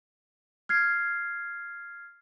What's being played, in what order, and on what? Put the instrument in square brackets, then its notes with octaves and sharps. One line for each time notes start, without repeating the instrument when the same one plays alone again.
[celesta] F6 G#6 C7